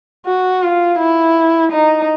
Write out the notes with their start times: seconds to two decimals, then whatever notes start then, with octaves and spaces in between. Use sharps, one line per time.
0.26 F#4
0.62 F4
0.99 E4
1.72 D#4